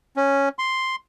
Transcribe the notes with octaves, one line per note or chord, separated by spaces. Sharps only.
C#4
C6